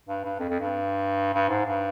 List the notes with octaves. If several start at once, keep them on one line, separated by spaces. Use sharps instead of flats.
G2
G2
F2
F2
G2
G2
G#2
G2